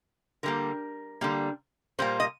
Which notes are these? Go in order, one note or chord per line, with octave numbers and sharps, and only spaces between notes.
D3 G3 A#3 A#4
D3 G3 A#3
A#2 G3 A#3 C5
D#5